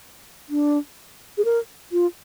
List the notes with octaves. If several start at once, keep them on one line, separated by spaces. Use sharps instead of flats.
D4
G#4
A#4
F4